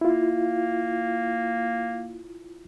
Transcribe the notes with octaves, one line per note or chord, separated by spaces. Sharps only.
A#3 E4 F4